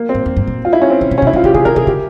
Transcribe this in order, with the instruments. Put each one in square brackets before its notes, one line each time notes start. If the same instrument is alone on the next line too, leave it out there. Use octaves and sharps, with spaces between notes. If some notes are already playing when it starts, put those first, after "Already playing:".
Already playing: [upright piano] A#3
C4
[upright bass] G#2
F2
G2
A#2
[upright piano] F4
E4
C#4
C4
[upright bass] C#3
C3
[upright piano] C#4
[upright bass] C3
[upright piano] E4
[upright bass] C#3
[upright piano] F4
[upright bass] C#3 [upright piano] G4
[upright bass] C#3 [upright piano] G#4
[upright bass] C3 [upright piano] A#4
[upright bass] C3 [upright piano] G#4
[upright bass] C#3 [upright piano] G4